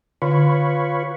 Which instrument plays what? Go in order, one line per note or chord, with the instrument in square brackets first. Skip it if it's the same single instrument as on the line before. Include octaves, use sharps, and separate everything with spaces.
[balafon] D3 [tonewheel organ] F4 B4 C#5